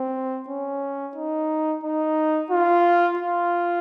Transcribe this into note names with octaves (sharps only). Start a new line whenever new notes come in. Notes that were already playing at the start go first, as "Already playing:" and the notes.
Already playing: C4
C#4
D#4
D#4
F4
F4